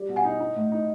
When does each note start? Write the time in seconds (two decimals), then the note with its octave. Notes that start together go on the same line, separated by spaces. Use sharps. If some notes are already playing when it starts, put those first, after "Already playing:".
Already playing: G3
0.09 B2
0.16 F#5 G#5
0.24 D#4
0.40 D#4
0.56 A2
0.72 D#4